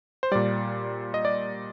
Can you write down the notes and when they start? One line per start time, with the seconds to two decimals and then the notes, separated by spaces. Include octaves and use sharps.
0.23 C5
0.32 A#2 G3 D5
1.14 D#5
1.25 D5